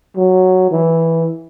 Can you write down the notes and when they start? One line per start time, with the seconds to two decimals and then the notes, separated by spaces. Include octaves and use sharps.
0.17 F#3
0.71 E3